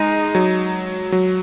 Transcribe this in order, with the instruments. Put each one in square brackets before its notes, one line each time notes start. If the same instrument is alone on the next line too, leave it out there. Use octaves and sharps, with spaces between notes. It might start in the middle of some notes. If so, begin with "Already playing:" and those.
Already playing: [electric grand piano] G#3 [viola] D#4
[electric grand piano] F#3
F#3